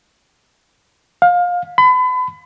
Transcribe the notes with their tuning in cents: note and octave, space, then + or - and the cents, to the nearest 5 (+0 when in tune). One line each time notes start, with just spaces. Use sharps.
F5 +25
B5 +35